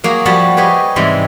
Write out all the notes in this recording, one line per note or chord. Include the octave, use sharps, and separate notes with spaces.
F#3 A#3 F#4 G#4
F3 G3 F#4 C#5 A5 B5
G4 G#4 B4 C#5 D#5
G#2 C3 E3 G3 G#3